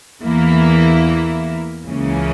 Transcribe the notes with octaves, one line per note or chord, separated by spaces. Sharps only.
E2 E3 A#3 E4
C#2 C#3 E3 A#3 C#4